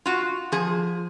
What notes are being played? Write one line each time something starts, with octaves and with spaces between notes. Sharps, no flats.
F4 F#4
F3 G#4